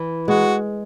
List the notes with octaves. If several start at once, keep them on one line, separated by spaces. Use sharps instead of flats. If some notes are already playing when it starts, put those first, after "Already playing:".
Already playing: E3
G#3 F#4